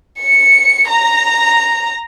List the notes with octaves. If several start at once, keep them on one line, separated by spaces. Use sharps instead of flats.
C#7
A#5